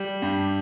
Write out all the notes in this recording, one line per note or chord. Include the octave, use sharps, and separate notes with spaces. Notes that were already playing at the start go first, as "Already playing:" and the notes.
Already playing: G3
G2